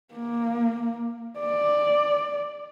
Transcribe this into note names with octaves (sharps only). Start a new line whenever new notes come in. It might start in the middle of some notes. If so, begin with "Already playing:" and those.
A#3
D5